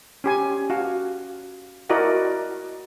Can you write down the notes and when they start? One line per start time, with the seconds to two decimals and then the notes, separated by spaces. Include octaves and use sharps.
0.24 C#4 G4 G#5
0.70 F#4 F5
1.90 E4 F#4 A#4 D5 D#5 F#5